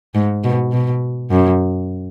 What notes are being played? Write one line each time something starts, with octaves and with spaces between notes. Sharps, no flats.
G#2
B2
B2
F#2